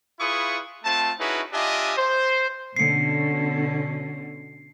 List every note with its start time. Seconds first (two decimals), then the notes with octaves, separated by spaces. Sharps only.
0.19 E4 F4 G#4 B4 C#6 D#6
0.84 A3 C4 F4 A5
1.19 C#4 D#4 E4 F#4 G#4 B4
1.52 D4 F4 G4 D#5 E5 G#5
1.97 C5
2.76 B2 D3 C#4 C7 C#7